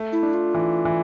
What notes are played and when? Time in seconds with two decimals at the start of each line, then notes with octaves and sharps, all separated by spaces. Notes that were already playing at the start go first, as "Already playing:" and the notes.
Already playing: A3
0.12 E4
0.23 D4
0.34 F4
0.54 E3
0.85 E3